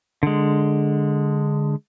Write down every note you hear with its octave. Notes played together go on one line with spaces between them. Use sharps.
D3 G#3